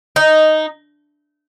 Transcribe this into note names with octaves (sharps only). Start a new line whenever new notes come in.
D#4